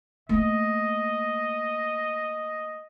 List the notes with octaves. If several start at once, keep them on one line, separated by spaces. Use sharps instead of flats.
A3 A#3 D#5